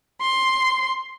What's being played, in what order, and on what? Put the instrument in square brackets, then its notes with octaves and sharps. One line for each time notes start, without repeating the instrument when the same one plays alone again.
[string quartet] C6